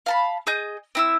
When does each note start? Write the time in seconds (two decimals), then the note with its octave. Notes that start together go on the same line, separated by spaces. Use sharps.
0.06 F5 A5 B5
0.47 G#4 D#5 G6
0.95 C4 E4 E6